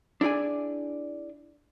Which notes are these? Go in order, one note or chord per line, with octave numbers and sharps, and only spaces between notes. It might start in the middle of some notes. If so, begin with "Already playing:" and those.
D4 E4 G#4 D5 G#5